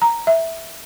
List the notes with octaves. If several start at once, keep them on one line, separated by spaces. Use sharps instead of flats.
A#5
E5